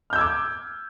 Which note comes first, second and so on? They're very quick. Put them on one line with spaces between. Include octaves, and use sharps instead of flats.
F6 G6 E6 G#6 D6